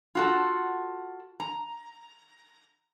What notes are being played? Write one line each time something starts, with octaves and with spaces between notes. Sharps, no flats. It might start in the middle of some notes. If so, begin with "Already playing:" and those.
F4 F#4 A4
A#5